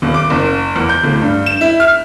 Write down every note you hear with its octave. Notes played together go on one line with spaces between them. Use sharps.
D#1
D6
F#1
E2
G6
D1
G2
E7
E4
F6